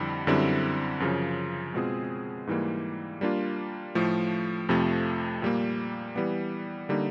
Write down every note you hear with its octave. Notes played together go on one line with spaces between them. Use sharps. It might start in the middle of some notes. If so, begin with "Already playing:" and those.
Already playing: F2 D3 G3 C4 E4
F#2 D3 G3 C4 E4
F#2 C#3 F3
B2 G#3 C4 F4 G#4
G#2 E3 G3 A#3
G3 A#3 D4 F4
A2 F3 A3
F2 C3 F3 A3
A#2 G3 A#3
E3 G3 B3
D3 G3 A#3 D#4